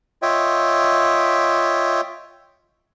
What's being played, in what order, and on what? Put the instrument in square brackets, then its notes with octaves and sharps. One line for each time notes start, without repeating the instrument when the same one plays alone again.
[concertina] F4 C#5 D#5 E5 G5